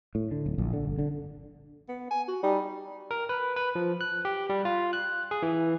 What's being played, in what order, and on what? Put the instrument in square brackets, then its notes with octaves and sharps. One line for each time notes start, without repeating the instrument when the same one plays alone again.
[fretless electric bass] A2
D3
D1
A#1
D3
G1
D3
[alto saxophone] B3
G#5
F#4
[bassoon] G3 [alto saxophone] D#4
[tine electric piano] A#4
B4
B4
F3
F#6
G4
G3
F4
F#6
G#4
E3